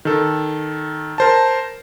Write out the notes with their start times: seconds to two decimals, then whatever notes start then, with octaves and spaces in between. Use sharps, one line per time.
0.05 D#3 A4
1.18 A#4 C5 A5